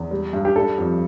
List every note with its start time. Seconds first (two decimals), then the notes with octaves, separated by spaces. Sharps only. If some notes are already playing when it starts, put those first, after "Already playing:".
Already playing: E2
0.11 G3
0.33 G2
0.45 G4
0.55 G3 A4
0.78 F2